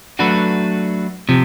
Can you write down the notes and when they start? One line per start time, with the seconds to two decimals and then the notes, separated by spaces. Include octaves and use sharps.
0.19 F#3 A3 D4 F#4 B4
1.29 C3 F3